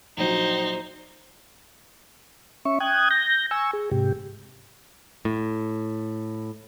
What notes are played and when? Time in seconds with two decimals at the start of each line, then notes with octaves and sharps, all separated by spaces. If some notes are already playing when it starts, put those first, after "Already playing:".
0.17 A#1 F#3 D#4 C5
2.65 C#4 E5 C#6
2.80 G5 D#6 F#6 G#6
3.11 G6 A#6
3.51 G#5 C#6 E6
3.73 G#4
3.91 G#2 C3 G4
5.25 A2